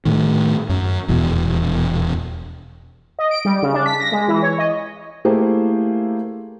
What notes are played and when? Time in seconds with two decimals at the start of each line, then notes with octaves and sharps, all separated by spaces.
0.05 A2 D#3
0.69 F#2
1.08 D#1 E2 B2
3.19 D#5
3.31 D7
3.45 G3
3.62 C#3
3.74 D4
3.86 B6
4.00 A#6
4.12 G#3
4.28 E3
4.43 C#5
4.58 D#5
5.25 A3 A#3 E4 G4 G#4 C5